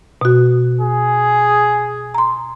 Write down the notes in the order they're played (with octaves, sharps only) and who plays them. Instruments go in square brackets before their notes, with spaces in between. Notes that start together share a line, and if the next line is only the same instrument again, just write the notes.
[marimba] B2 F#4
[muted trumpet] G#4
[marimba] A#5 C6